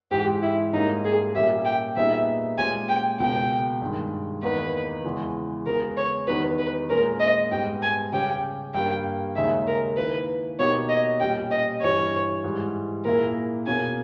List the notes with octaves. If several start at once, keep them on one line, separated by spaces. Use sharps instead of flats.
G#2 E3 G#3 G4
E4
G#2 G3 A#3 C#4 D#4
G#4
A#2 G3 A#3 C#4 G4 E5
G5
A#2 G3 B3 D#4 G#4 E5
A#2 G#3 C#4 G4 G#5
G5
C#2 B2 A#3 G5
G2 D#3 G#3
E2 D#3 A#3 D#4 B4
E2 C#3 E3 G#3
C#3 G#3 B3 A#4
C#5
E2 D#3 G3 B3 D#4 B4
B4
A#2 G#3 C#4 A#4
D#5
G#2 G3 B3 G5
G#5
C#3 G3 C#4 G4 G5
G2 G3 A#3 G5
D#2 C#3 G#3 D#4 G#4 E5
A#4
D#3 A#3 E4 B4
B2 A#3 D#4 G4 C#5
D#5
A#2 G3 C#4 G5
D#5
G2 E3 G3 C#5
G#2 E3 G3
A#2 A#3 E4 G#4 A#4
B2 A#3 C#4 G#4 G#5